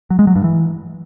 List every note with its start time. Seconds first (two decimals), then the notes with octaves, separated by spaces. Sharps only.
0.10 F#3
0.19 G#3
0.27 F#3
0.36 G2
0.44 E3